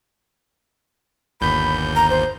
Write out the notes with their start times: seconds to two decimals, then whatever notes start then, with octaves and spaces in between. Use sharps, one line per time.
1.41 G1 D#2 B5 G6
1.96 A#5
2.10 C5